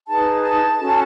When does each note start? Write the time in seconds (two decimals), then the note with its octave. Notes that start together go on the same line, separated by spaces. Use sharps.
0.07 D#4 G#4 B4 A5
0.42 A5
0.77 C#4 F#4 A4